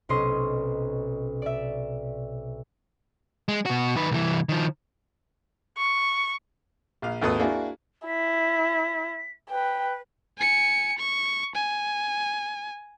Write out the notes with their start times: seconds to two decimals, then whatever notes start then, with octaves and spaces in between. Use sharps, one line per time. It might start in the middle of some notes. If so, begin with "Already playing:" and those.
0.09 B1 C3 C#4 D#5 C6 C7
1.42 D5 E5
3.48 G#3
3.66 B2 F#4
3.96 D#3 B4
4.11 C2 E3
4.49 D#3 F3
5.77 C#6
7.02 A#1 F5
7.21 G#1 D#2 A4 B4 D#6
7.40 A#3 D4 E4 F#4 G#4
8.07 E4 B6
9.50 B4 G5
10.38 G#5 C#7
10.98 C#6
11.55 G#5